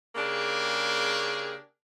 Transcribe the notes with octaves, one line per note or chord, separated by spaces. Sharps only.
C#3 A#3 D4 G4 G#4